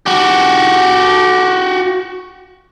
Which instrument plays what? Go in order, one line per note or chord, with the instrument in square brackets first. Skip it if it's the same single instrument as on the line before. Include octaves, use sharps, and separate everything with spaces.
[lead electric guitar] F#4 G4